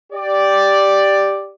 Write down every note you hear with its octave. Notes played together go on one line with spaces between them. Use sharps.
G4 D5